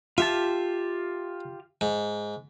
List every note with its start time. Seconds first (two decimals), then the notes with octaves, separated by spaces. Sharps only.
0.18 F4 G4 E5 A5
1.81 G#2